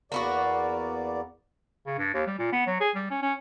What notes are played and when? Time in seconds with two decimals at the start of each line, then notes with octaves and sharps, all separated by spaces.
0.12 E2 A#3 B3 F#4 D5
1.86 C#3
1.98 G2
2.14 D#2
2.26 G3
2.38 A#2
2.52 B3
2.66 F#3
2.80 G#4
2.95 G3
3.10 C#4
3.22 C#4